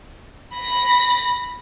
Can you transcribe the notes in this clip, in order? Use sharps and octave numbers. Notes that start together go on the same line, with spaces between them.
B5 A#6